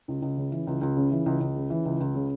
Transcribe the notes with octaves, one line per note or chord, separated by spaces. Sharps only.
C#2
C#2
C#3
E3
C#2
C#2
C#3
E3
C#2
C#2
C#3
E3
C#2
C#2
C#3